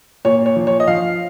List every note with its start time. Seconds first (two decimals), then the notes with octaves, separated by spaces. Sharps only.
0.25 A#2 C#5
0.46 C#5
0.56 F3
0.67 C#5
0.80 D#5
0.87 F3 F5